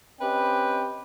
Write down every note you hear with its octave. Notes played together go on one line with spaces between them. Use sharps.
C4 C#4 G4 B4 D#5 G5